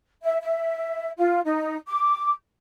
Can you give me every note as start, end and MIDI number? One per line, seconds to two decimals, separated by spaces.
0.24 0.38 76
0.42 1.10 76
1.17 1.40 65
1.44 1.77 63
1.87 2.31 86